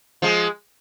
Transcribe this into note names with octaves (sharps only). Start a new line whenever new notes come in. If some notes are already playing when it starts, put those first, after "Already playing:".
F3 G#3